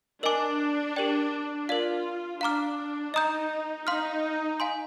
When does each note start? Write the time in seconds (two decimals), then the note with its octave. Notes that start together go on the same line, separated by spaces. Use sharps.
0.23 D4 A#4 D#5 G#5 D6
0.96 G4 A#4 D5 G5
1.68 F4 A#4 D5 F5
2.41 D4 F5 A#5 D6 F6
3.14 D#4 D#5 A#5 D#6 G6
3.87 D#4 F5 C6 F6
4.60 F5 G#5 C6